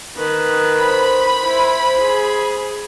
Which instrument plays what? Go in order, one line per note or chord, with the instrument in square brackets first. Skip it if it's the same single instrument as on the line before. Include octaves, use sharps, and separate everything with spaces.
[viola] D#3 B4
[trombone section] C5 [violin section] B5
[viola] E4
G#4